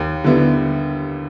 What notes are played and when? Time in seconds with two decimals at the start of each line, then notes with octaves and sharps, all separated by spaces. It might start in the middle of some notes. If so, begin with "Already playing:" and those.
Already playing: D#2
0.24 D3 G3 B3 E4